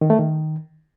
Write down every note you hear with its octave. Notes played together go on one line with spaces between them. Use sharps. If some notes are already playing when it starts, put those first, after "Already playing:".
D#3
A3
D#3